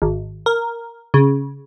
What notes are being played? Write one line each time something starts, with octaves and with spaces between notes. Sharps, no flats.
G#1
A#4
C#3